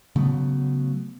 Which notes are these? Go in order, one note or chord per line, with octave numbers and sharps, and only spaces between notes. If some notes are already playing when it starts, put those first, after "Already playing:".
C#3 F#3 A3 B3